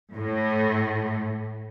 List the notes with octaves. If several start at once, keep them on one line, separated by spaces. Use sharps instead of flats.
A2